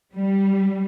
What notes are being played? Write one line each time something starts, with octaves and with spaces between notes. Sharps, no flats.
G3